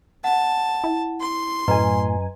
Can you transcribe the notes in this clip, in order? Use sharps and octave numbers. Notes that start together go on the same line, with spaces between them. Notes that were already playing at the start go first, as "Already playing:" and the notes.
F#5 A5
E4
C6
F#2 A2 B4 D#5 G#5 A#5